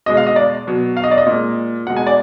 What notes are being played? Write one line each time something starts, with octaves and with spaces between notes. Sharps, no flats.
B2 G#3 D#5
F5
D#5
D5
B2 F#3
F5
D#5
D5
D#5
A#2 G#3
B2 G#3 F#5
G#5
D5